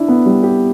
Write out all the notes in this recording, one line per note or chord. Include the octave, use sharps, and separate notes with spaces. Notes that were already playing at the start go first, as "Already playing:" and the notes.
Already playing: D4 E4
B3
G3
G4